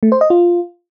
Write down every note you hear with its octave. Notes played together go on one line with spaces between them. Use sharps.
A3
C5
D#5
F4